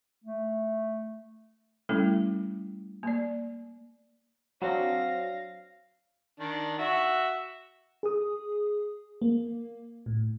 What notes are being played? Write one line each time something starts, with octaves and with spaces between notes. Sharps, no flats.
A3
G3 A3 C#4 E4 A4
A#3 D5
F#3 C4 D4 F5 A#6
D#3 D4
F#4 E5
G#4 D#6
A#3
A2